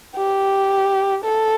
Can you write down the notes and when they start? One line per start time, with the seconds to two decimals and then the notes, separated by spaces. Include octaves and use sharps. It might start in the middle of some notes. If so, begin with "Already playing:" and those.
0.16 G4
1.24 A4